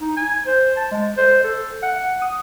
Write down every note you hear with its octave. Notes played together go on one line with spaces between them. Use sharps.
D#4
G#5
C5
A5
G#3
C5
A4
F#5
D#6